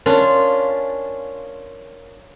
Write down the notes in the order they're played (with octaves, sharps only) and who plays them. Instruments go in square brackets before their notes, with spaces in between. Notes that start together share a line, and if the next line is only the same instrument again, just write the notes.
[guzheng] C#4 D4 F4 [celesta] A#4